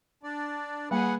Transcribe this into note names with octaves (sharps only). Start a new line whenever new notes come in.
D4 D5
G3 A#3 G#4 B4 F#5